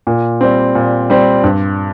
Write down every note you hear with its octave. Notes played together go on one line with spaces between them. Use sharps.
A#2
G3 C4
A#2
G3 C4
G2